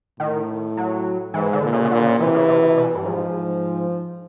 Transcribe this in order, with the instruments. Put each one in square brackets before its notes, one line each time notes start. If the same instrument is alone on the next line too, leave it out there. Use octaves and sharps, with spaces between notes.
[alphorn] A2 [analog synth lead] D#3
[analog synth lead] F#3
[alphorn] G#2 [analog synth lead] E3
[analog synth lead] D3
[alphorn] A#2
[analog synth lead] C#3
C#3
[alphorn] A#2 [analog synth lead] D3
[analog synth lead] C#3
[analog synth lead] C3 [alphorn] E3
[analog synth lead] C#3
C3
C3
B2
G2
[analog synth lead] G#2 [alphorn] F3